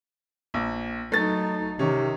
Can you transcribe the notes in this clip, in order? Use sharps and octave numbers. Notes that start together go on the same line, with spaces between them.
A#1
F#3 A3 D#4 A6
C3 D#3 C#4